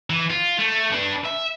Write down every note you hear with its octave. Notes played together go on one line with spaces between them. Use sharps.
E3
F4
A3
D4 B4
E5